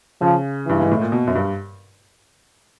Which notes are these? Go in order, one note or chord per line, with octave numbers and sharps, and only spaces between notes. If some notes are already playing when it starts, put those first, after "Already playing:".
C#3 F3
G2 E3
G#2
A2
A#2
B2
F#2
G2